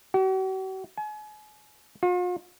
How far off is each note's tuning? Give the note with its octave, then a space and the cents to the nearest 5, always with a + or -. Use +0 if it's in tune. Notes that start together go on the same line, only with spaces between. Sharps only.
F#4 +45
G#5 +35
F4 +45